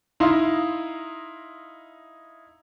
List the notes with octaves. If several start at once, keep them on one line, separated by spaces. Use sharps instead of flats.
D#4 E4 D#5 F5 C6